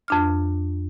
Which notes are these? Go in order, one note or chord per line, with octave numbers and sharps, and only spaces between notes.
F2 D4 F6